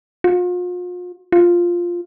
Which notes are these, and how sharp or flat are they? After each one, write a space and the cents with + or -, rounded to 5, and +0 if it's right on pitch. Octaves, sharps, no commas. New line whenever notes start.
F4 +40
F4 +0